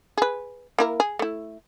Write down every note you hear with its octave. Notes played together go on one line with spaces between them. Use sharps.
G#4 B4
A#3 E4 A#4
G#4
A3 E4